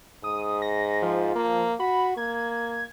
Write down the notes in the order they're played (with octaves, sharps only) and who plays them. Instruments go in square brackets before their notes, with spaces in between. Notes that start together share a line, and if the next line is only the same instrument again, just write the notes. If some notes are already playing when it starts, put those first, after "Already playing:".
[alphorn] G#2 [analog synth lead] D#6
[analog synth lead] A#6
F3
[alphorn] A#3
[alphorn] F#4 [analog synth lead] B5
[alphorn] A#3 [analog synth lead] G#6